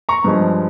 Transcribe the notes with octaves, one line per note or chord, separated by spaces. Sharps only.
A#5 C#6
G2 F3 G#3